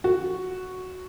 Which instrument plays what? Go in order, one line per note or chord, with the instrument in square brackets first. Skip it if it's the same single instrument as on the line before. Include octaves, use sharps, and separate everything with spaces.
[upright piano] F#4